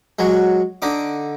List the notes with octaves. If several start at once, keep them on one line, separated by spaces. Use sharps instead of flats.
F#3 G#3
D3 D#4 D6